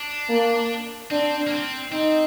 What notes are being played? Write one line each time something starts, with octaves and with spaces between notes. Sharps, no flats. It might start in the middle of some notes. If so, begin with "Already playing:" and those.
Already playing: D4
A#3
C4 D4
A#3
C4
C4 D#4